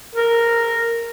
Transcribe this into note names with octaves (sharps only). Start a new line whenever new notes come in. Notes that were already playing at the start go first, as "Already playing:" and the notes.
A#4